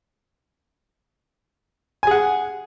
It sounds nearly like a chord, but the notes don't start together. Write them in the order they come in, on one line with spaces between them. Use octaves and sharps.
G#5 G#4 F#5